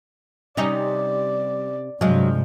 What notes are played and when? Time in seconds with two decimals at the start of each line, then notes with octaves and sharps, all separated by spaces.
0.57 C3 G3 C#4 D#4 D5
2.01 G2 C3 F3 F#3 G#3